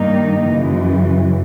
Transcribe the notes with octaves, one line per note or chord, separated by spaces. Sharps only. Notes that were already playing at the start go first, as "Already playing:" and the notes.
Already playing: G2 D#3 G3 A#3 D#4
F#2 C#3 E3